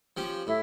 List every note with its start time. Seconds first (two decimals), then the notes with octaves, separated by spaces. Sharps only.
0.17 F3 C#4 G4
0.47 A2 E4